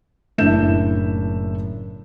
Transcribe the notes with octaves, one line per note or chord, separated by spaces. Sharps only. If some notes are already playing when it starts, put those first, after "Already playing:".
F#1 A2 D4 E5 G6 E7